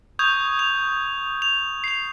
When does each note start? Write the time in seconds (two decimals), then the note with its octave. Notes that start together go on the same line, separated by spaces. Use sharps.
0.19 C#6 D#6 G6 G#6 F7
0.59 F7
1.42 F7
1.84 C7 F7